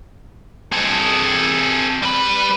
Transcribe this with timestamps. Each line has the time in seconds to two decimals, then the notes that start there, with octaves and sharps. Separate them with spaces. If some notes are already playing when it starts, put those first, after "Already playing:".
0.73 C4 G#4 A4 D#5
2.03 G3 B4 B5